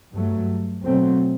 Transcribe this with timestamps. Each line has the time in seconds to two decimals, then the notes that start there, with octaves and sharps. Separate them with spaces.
0.13 G2 F#3 A3
0.84 B2 F#3 A3 C4